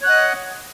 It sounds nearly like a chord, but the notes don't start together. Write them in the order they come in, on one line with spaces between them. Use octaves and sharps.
C#5 F#6 F#5 D#5